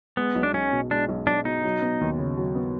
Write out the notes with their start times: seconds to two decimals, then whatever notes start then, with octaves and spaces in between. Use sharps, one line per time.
0.17 G#3 B3
0.36 B1
0.43 D4
0.54 B1 C#4
0.73 B2
0.91 G#3 D4
1.09 B1
1.27 B1 D4
1.45 B2 D#4
1.64 F#3
1.82 B3
2.01 D#2
2.18 C#3
2.37 F#3
2.55 B3